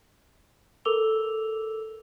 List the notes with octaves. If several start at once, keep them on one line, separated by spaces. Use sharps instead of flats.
A4 A#4 D6 E6 F7 G7